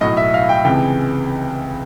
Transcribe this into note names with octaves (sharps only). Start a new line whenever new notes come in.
B1 A2 F#3 D#5
E5
F5
G5
C#2 C3 E3 G#3 G5